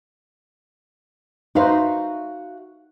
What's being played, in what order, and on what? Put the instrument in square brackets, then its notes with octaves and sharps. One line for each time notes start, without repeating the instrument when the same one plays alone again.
[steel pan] D#4 B4 C5 [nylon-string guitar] F#4 E5 F5